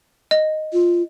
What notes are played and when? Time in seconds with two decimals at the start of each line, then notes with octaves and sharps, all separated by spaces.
0.31 D#5
0.73 F4